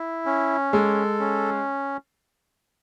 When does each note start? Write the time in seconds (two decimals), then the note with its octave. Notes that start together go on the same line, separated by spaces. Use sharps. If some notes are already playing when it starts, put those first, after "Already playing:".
Already playing: E4
0.26 C#4
0.73 G#3 A4
1.20 C#4